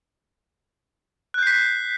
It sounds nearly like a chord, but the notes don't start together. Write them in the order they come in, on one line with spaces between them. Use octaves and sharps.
F#6 G6 C7 B6